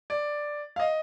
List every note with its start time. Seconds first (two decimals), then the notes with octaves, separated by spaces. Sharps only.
0.10 D5
0.76 F5
0.80 D#5